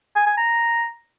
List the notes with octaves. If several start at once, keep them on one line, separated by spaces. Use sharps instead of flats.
G#5
G#5
A#5